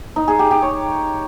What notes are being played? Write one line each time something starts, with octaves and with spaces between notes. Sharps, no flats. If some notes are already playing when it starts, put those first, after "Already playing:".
D#4
G#4
G4
G4
C#5